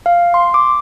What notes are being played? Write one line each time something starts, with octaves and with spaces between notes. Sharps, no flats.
F5
C6
D6